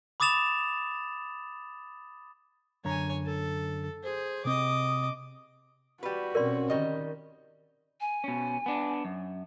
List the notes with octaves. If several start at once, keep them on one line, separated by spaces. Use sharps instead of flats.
B5 D6 D#6 A6 E7 F7
F#2 D3 C#5 G#5 A#5
A4
G#4 C5
C3 C4 D#5 D6 D#6
G3 F#4 B4
B2 C4 C#4 A#4 D5 C6
D#3 G3 D#5
G#5
B2 C#4
B3 D4
F#2